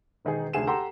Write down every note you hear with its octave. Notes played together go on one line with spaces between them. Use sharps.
E1 D#3 D#4 G#4
F1 D2 G#4 E7
G4 A4 F#5 G5 A#5 C6